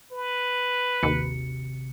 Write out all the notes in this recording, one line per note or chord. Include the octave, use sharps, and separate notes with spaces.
B4
G#1 D#2 C3 C#7